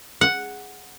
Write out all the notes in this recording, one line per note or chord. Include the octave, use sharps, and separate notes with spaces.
F#5